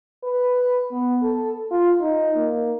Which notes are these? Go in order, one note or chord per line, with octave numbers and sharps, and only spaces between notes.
B4
B3
A4
F4
D#4
A#3